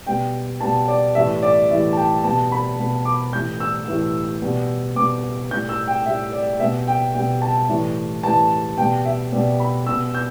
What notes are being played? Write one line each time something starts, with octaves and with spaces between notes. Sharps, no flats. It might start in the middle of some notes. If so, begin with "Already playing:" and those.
B2 G3 G5
B2 G3 A5
D5
A2 E3 G3 E5
D5
A2 E3 G3 E5
A5
G5
B2 G3 A5
B5
B2 G3
D6
A2 E3 G3 G6
E6
A2 E3 G3
B2 G3
B2 G3 D6
A2 G3 G6
E6
G5
A2 G3 E5
D5
B2 G3 E5
G5
B2 G3 G5
A5
A2 E3 G3
A2 E3 G3 A5
B2 G3 G5
E5
B2 G3 D5
B5
B2 G3 E6
G6